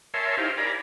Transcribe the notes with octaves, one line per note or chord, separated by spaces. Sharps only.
A#4 C#5 E5 G#5 A5 C6
D#4 E4 G4 C5 F5
A#4 D5 G#5 A#5 B5